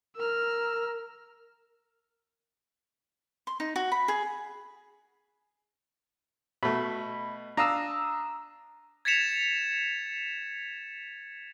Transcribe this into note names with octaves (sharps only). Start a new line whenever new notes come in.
A#4 E6 F6
C6
D#4
F#4
B5
G#4
B2 A3 B5
D4 F5 A#5 D#6 E6
G#6 A6 B6 C#7 E7 F7